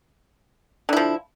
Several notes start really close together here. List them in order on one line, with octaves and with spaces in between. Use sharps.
D3 E4 F3